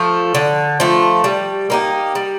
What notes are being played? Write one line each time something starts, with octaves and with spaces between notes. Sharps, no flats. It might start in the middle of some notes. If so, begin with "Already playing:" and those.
Already playing: F3 A3
D3
F3 A3
G3
A#3 D#4 G4
G3